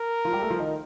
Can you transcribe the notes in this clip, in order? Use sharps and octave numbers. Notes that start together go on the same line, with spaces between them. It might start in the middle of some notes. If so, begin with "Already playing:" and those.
Already playing: A#4
F3 F4
G3 G4
A3 A4
F3 F4
D#3 D#4